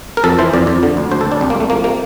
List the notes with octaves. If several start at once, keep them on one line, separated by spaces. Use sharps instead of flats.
A#4
F2 A4
E3 C5
F2 D5
F2
D3
D2
D2 C5
A4
D2
D4
C2
A#3
C2
A3
F3 A#3
C3 A#3